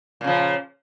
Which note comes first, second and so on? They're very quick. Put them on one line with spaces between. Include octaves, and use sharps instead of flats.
A#2 C#3 F3